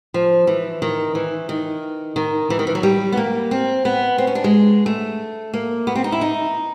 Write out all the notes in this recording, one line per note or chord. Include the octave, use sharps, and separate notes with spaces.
F3
E3
D#3
E3
D#3
D#3
E3
D#3
E3
F#3
G3
B3
A#3
C4
B3
C4
C#4
D4
G#3
A3
A#3
B3
C4
D#4
E4
D#4